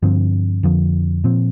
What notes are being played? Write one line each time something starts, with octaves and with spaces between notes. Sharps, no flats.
G2 D3 F3 C4
F2 D3 F3
A#2 F3 C4